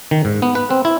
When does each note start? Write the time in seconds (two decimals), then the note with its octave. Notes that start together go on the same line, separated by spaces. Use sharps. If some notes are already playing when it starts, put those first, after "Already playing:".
0.11 D#3
0.25 G#2
0.42 B3
0.55 B4
0.71 C4
0.85 E4